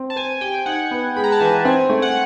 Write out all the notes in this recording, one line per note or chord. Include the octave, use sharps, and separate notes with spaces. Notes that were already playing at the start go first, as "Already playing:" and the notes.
Already playing: C4
A5
C5 G#5
G4 G5
D#4 F#5
B3
G#3 B5
A#5
A5
E3 G#5
C4 G#5
A3
F#5